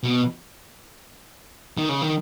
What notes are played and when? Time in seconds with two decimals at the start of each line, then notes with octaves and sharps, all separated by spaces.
0.03 B2
1.78 D#3
1.89 C#3
2.02 D#3